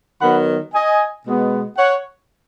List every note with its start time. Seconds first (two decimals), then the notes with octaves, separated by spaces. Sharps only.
0.21 D#3 F#3 B3 F#5 B5
0.73 D#5 G#5
1.25 B2 G#3 B3
1.77 C#5 F#5